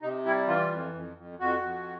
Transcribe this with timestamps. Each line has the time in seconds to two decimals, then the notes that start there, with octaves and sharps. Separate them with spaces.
0.02 C3 D#4
0.25 G3 E4
0.48 E3 F4
0.70 F2
0.94 F2
1.17 F2
1.39 F2 F#4
1.62 F2